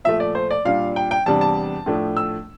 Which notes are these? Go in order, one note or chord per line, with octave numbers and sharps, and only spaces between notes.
A#2 F3 A3 E5
D5
C5
D5
A#2 G3 D4 F5
G5
G5
E2 C3 G3 D4 A5
A5
A2 F3 A3 D4
E6